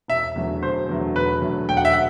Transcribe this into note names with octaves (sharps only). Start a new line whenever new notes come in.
E1 E5
E2 D3 F#3 A3
E1 C5
E2 D3 F#3 A3
E1 B4
E2 D3 F#3 A3
E1 G5
F#5
E5
F#5